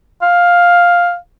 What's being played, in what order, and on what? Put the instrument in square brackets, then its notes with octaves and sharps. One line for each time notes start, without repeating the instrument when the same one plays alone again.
[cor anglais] F5